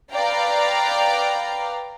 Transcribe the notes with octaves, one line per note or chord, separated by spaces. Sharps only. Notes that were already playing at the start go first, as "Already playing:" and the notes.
B4 D5 F5 G5 A#5